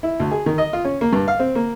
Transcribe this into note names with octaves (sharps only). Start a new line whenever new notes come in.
E4
D2
G#4
D#3
D#5
F4
C#4
A#3
G2
F5
C4
A#3